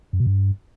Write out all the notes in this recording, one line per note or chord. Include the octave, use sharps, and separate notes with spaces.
F#2
B2
G2